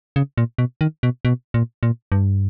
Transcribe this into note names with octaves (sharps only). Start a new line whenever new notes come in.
C#3
A#2
B2
D#3
B2
B2
A#2
A#2
G2